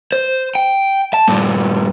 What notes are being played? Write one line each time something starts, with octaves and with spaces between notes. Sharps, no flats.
C5
G5
A5
G2 A#2